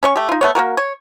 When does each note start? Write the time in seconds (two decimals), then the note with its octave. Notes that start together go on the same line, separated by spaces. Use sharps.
0.03 C#4 C#5 C#6
0.16 A3 G4
0.29 D#4 F4
0.41 A3 B3 C#5
0.55 A#3 C#4 F#4 A#4
0.77 C#5